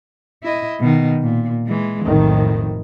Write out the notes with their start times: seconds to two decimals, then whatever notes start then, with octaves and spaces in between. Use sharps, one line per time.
0.43 E4 D#5
0.80 B2 D#3
1.23 A#2
1.67 E3 G#3
2.05 B1 F2 A2 D#3